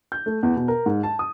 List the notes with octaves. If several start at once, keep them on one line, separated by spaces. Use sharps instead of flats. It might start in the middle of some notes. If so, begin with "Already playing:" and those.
G6
A3
E2
B2
A#4
G#2
A5
D#6